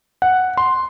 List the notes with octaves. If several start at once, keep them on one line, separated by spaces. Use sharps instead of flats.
F#5
C6